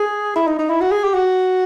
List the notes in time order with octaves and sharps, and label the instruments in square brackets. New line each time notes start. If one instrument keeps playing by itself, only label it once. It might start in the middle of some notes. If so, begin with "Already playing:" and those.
Already playing: [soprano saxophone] G#4
E4
D#4
D#4
E4
F#4
G#4
G4
F#4